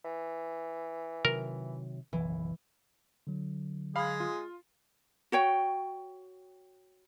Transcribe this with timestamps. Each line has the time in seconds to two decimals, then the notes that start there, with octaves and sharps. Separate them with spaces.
0.05 E3
1.25 C3 D#3 F#3 A#4
2.13 F#1 B1 E3
3.27 D3 F#3
3.96 G#3 F5 B5
4.20 F4
5.32 F#4 C#5 G5